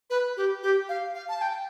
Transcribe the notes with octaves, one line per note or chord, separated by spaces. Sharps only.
B4
G4
G4
F5
F5
A5
G5